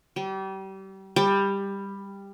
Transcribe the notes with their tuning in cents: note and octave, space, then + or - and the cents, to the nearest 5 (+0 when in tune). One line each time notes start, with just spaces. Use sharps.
G3 -30
G3 +15